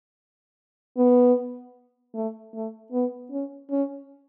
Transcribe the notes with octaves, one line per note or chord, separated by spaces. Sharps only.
B3
A3
A3
B3
C#4
C#4